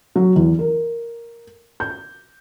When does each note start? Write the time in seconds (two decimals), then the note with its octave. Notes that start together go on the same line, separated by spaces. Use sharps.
0.16 F#3
0.36 E2
0.59 A#4
1.80 G6